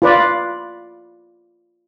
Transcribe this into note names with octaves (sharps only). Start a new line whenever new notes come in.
F4 B4 D5